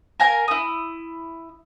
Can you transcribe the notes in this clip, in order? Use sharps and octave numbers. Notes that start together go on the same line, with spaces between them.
A#4 F5 G#5 A#5
E4 D#6